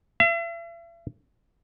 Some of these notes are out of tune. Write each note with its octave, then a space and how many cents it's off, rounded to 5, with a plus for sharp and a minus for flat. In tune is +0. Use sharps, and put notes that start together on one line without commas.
E5 +40